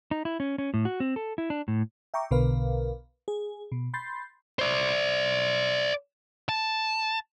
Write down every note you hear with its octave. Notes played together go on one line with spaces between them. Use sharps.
D#4
E4
C#4
C#4
A2
F#4
C4
A4
E4
D4
A2
E5 G5 A#5 C#6 D6
B1 B2 D3 A#4 B4 F5
G#4
B2
B5 C6 G6 A6 C7
C5 D5
A5